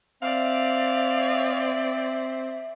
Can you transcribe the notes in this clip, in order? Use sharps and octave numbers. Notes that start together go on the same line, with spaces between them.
C4 D5 E5 F5